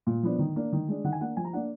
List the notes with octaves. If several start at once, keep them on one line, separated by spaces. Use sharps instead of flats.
A#2
F3 B3 D4
D#3
A#3 D4
D#3
G#3 D4
D#3 F#5
G#5
A#3 D4 F#5
F3 G#5
A#5
A#3 D4 F#5